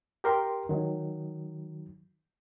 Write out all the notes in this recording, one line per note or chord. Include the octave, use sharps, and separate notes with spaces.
G4 A#4 C6
D#3 F#3